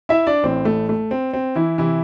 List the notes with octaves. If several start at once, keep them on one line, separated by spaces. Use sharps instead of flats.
E4 E5
D4 D5
A1 A2 E3 C4
A3
A3
C4
C4
E3 E4
C3 E3 E4